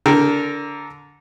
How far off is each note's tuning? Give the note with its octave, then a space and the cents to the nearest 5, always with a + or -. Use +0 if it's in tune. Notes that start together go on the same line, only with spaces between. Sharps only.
D3 -15 A#4 +0